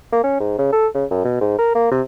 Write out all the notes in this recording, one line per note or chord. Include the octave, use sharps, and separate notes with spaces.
A#3
C#4
G#2
C#3
A4
C#3
F#2
B2
G#2
A#4
A#3
C3